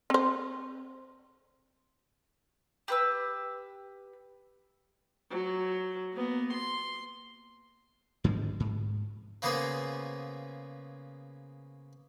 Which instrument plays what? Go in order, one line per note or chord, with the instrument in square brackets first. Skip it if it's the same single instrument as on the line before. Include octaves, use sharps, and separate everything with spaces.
[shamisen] C4 C5
[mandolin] G4 B4 E6
[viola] F#3
A#3 B3
C6
[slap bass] G#2 D3 F3 G#3
G#2
[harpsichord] C#3 A#3 B3 C#4 G#4 C5